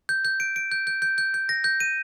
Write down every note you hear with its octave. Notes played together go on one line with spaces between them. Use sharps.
G6
G6
D7
D7
G6
G6
G6
G6
G6
A#6
G6
D#7